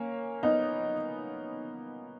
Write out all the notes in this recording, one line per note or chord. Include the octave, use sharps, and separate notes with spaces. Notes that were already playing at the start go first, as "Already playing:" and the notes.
Already playing: A#3 C#4
B3 D#4